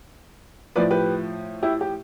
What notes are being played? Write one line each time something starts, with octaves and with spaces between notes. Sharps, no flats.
A2 F3 B4 D5
G4 B4
E4 G4
G4